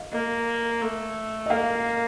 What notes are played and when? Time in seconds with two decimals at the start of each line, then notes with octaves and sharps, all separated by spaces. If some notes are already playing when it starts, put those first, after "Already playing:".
Already playing: D#5 F5
0.12 A#3 D#5
0.82 A3
1.46 D#5
1.50 A#3 F5